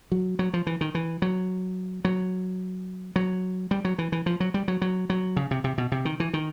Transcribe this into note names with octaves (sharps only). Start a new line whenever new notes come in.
F#3
F#3
F3
E3
D#3
E3
F#3
F#3
F#3
G3
F#3
E3
E3
F3
F#3
G3
F#3
F#3
F#3
C#3
C3
C3
B2
C3
D#3
E3
D#3